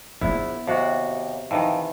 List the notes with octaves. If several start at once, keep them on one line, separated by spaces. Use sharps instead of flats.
A#1 B3 C4 E4
D#2 C3 F#4
F2 D#3 E3